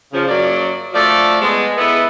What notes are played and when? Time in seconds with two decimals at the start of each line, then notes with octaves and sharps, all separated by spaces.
0.13 C#3 F3
0.29 F#2 F#3 A#3 D5
0.94 F3 A3 A4 D5
1.42 G#3 B3
1.78 G#3 B3 E4 A4 B4 E5